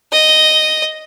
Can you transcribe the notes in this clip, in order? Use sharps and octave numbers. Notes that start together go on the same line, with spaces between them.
D#5